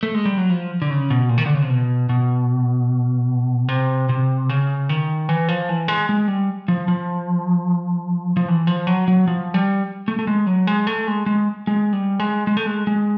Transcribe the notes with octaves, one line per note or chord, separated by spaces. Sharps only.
A3
G#3
G3
F#3
F3
D3
C#3
B2
A#2
D#3
D3
C#3
C3
B2
B2
C3
C3
C#3
D#3
E3
F3
E3
G#3
G#3
G3
F3
F3
F3
E3
F3
F#3
F#3
F3
G3
A3
A3
G#3
F#3
G#3
A3
G#3
G#3
G#3
G3
G#3
G#3
A3
G#3
G#3